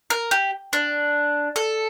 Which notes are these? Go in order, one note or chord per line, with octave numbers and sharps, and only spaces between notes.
A#4
G4
D4
A4